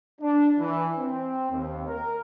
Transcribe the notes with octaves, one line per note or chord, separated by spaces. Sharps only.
D4
E3
C4
D#2
A#4